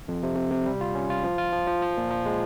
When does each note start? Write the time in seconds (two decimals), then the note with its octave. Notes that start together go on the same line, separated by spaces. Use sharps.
0.08 F2
0.23 C3
0.36 C3
0.51 C3
0.66 G3
0.81 F4
0.95 C#4
1.10 F4
1.24 F3
1.38 F4
1.53 F3
1.67 F3
1.82 F3
1.97 A#2
2.11 F3
2.26 G#3